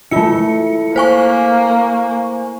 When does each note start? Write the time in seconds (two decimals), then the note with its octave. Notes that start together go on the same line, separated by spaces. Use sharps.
0.11 A3 E4 F4 C#7
0.96 A#3 C5 G#5 C#6